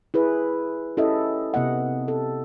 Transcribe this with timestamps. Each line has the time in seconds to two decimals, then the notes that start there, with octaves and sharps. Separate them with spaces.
0.14 E4 G#4 B4
0.97 C#4 E4 G4 A4 D#5 E5
1.54 C3 B3 D#5 F#5
2.08 A4